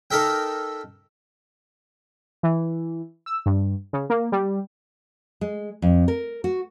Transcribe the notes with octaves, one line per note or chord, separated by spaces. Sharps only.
D#4 A4 A#4 E5 G5
E3
E6
G2
C#3
A#3
G3
G#3
F2
A#4
F#4